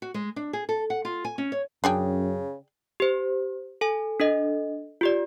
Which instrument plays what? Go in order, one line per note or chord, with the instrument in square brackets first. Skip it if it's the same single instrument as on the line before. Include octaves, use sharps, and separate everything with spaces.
[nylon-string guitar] F#4
G#3
D4
G#4
A4
F#5
F4
G#5
C#4
C#5
[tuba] F#2 [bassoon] C#3 [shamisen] D4 G#4 G5
[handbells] G4 C5
A4 G#5
D4 A4 D#5
F4 G4 D5